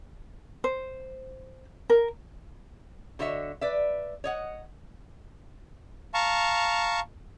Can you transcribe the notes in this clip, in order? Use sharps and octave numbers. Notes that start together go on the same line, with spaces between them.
C5
A#4
D3 F#4 C#5 D#5 E5
B4 D5 E5
C#5 D#5 F#5
F5 A5 A#5 C#6